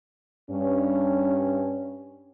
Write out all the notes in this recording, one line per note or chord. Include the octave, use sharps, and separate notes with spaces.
G2 C#4